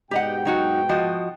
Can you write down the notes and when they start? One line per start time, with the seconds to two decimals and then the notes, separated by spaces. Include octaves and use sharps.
0.11 G#2 B2 G4 D#5 F#5 G5
0.45 F#3 D#4 F#4
0.89 F3 F#4 D#5